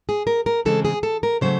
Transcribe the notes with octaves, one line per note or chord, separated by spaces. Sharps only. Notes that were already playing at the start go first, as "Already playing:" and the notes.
G#4
A#4
A#4
C#3 E3 G#3 C4 A4
G#4
A4
A#4
C#3 F#3 A3 C5